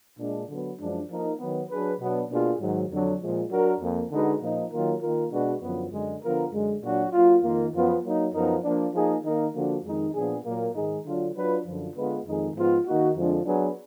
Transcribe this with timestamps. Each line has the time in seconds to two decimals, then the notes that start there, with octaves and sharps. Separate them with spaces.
0.19 A#2 G#3 D4
0.49 D3 F#3 B3
0.78 F#2 F3 G#3 D4
1.09 F3 A#3 D#4 A#4
1.39 D#3 F#3 B3
1.69 F#3 D4 G#4 B4
2.00 B2 F#3 B3 D4
2.30 B2 A#3 D4 F4 G#4
2.60 G#2 D#3 F#3
2.90 F2 D3 F#3 D4
3.20 A#2 F3 G#3
3.50 F#3 D4 F#4 A#4
3.81 F2 F3 A#3
4.11 D3 G#3 D#4 F#4 B4
4.41 A#2 F3 A#3 D#4
4.71 D#3 F#3 A#3 F4 A#4
5.01 D#3 A#3 F4 A#4
5.31 B2 G#3 D4 F#4 B4
5.62 F#2 D3 F3 B3
5.92 F#2 D3 G#3
6.22 D3 F3 B3 F4 A#4
6.52 F#2 D3 G#3
6.82 A#2 F#3 D4 F#4
7.13 F#3 A#3 F4
7.43 F2 D#3 A#3 F4
7.73 F#2 F3 B3 F4
8.03 F#3 A#3 D#4
8.33 F#2 F3 B3 D#4 A#4
8.64 F3 A#3 D4
8.94 F3 A#3 D#4 G#4
9.24 D#3 A#3 D#4 A#4
9.54 D3 F3 A#3 D4 F#4
9.84 F2 D#3 G#3 D#4
10.14 A#2 F3 B3 D4 G#4
10.44 A#2 F#3 A#3
10.75 G#2 D#3 G#3 D#4 G#4
11.05 D3 F#3 D4 F4
11.35 F#3 D4 F4 B4
11.65 F#2 D3 F3
11.95 D3 G#3 B3 F4 B4
12.25 F2 D#3 G#3 D#4 G#4
12.55 G#2 F3 B3 F4
12.85 D#3 A#3 D#4 F#4
13.16 F2 D3 F3 G#3 D4
13.46 F#3 B3 D4 G#4 B4